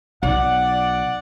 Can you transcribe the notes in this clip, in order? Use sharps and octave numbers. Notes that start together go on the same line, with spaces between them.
B1 D5 F#5